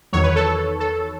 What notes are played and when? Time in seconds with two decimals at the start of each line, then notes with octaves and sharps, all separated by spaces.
0.13 E2 D#3 F#3 C#5
0.24 B4
0.36 A4
0.80 A4